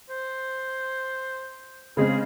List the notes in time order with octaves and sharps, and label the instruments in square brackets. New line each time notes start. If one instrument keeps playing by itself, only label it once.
[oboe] C5
[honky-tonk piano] C#3 G#3 C4 [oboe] G#4